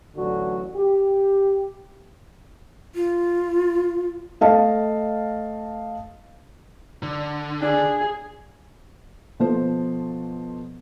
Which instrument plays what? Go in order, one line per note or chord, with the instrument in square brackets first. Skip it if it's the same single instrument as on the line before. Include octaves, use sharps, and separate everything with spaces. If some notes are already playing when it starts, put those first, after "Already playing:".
[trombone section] A1 D3 F#3 F#4
G4
[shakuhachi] F4
[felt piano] A3 D#5 F5 A5
[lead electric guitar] D3
[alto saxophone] D4 [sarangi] G#4
[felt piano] B2 F3 A4 C5